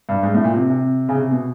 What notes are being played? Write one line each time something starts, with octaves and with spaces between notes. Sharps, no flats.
G2
G#2
A2
A#2
C3
C3
C#3
C3
B2